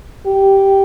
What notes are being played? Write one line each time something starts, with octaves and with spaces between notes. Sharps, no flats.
G4